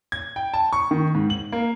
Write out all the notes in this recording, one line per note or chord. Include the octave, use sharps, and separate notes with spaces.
G#6
G5
A5
C#6
D#3
G#2
F#7
A#3